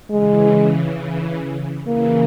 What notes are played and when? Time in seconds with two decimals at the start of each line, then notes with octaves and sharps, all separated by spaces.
0.10 C#3 E3 G#3
1.88 C#3 E3 A#3